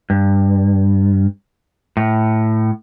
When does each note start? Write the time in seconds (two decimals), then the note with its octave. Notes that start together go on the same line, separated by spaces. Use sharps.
0.10 G2
1.97 A2